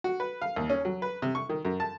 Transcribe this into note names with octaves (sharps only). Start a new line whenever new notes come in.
F#4
B4
F5
D#2
C#4
F#3
B4
C3
C#6
D#3
F#2
A5